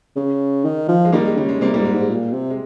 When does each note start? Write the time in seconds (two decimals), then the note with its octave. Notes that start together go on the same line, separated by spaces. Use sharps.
0.16 C#3
0.65 D#3
0.89 F3
1.05 G#3
1.12 D#3 G3 A#3
1.26 G#3
1.37 C#3 G3
1.49 G#3
1.61 C3 G3 A#3
1.74 G3 A#3
1.78 G#2
1.85 G#3
1.93 G#2
2.10 A#2
2.33 C3
2.50 G#3